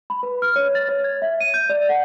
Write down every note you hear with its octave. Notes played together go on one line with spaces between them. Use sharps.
B5
B4
F6
C#5
A6
C#5
G#6
E5
D#7
G6
D5
F#5